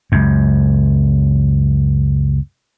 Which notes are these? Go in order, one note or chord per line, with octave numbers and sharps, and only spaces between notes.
C#2 F#2